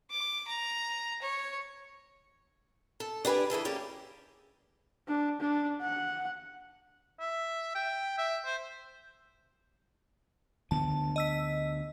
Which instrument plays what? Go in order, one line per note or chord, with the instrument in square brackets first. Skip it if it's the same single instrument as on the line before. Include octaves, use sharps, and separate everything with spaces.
[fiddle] D6
A#5
C#5
[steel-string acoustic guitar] A4
D4 G4 B4 D5 G#5
E3 E4 G#4 A4
A#3 C#4 G4 D5
[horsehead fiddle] D4
D4
F#5
[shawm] E5
G5
E5
C5
[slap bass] D2 D3 B3 [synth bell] A5
[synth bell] D#5 E6 B6